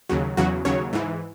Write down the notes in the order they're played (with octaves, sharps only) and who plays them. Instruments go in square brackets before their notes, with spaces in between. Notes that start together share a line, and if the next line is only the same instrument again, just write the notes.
[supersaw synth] D#2 C#3 F#3
E2 C#3 F#3 F#4
D#2 C#3 F#3 C#5
G#2 E3